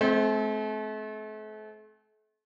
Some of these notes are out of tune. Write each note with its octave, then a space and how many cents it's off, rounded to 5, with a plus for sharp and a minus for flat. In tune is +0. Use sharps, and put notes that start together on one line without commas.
A3 -40 C4 +0